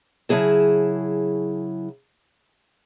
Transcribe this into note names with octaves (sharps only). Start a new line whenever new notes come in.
C#3 F#3 E4 G#4 A5